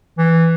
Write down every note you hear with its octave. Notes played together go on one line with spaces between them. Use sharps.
E3